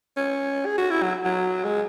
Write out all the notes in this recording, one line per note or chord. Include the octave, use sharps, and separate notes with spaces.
C#4
G#4
F#4
E4
F#3
F#3
G#3